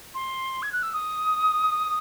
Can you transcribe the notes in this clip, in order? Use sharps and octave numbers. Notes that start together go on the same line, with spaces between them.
C6
G#6
F#6
E6
D#6